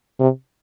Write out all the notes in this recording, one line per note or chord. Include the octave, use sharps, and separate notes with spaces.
C3